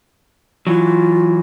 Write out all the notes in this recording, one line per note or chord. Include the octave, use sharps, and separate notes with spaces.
E3 F#3 F4